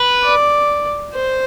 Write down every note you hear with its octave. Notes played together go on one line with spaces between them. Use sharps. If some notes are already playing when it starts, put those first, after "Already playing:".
Already playing: B4
D5
C5